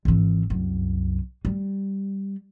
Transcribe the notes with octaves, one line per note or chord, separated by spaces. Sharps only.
G#1 E3
C2 F#2
G3